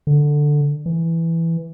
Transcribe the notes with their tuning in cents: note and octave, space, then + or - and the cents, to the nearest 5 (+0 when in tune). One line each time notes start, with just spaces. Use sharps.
D3 +5
E3 +5